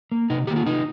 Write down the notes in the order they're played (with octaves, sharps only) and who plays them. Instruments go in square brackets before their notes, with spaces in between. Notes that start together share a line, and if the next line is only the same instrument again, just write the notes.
[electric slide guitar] A#3
C3 D#4
D#3 A#3 G4
F4
C3 D#4